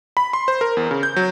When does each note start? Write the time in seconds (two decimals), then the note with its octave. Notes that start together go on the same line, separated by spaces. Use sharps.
0.17 B5
0.33 C6
0.48 C5
0.61 A#4
0.77 E2
0.91 C#3
1.03 G6
1.16 F#3